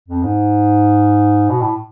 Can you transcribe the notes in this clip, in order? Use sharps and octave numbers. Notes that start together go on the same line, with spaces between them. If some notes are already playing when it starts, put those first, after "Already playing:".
F2
G#2
B2
A2